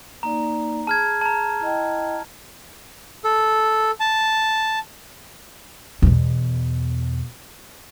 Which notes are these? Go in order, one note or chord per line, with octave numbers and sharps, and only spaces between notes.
A#3 D#4 D5 A#5
G#4 A5 F6 G#6
A5 A#5
E4 D#5 G5
A4
A5
E2 B2